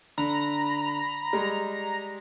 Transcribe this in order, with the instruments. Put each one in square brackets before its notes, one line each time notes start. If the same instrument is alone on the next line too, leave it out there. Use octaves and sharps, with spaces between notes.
[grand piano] D3 [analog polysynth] A#5 [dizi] B5
[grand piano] G3 G#3